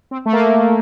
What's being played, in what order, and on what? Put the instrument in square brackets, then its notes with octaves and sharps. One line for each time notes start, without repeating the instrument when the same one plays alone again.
[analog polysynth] C4
A3
A#3